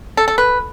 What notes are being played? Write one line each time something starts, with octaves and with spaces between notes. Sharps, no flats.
A4
A4
B4